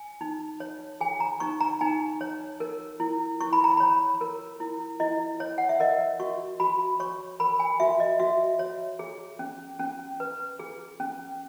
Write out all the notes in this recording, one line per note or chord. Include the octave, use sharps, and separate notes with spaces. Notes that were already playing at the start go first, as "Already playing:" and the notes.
Already playing: G#5
D#4
C#5
G#4 G#5
A#5
D#4 C#6
A#5
D#4 G#5
C#5
A#4
E4
E4 C#6
B5
A#5
C#5 B5
A#4
E4
E4 D#5
C#5
F#5
E5
A#4 D#5
F#4 C#6
F#4 B5
C#5 C#6
A#4 B5
G#5
F#4 E5
D#5
F#4 E5
C#5
G#4
C#4
C#4
B4
G#4
C#4